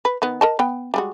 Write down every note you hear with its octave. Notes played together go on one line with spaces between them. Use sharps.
B4
D#3 B3
A#4 D#5 A5
B3 G5
G3 G#3 F#4